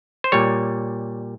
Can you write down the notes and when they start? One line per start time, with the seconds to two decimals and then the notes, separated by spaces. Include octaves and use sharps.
0.24 C5
0.32 A#2 G3 C#5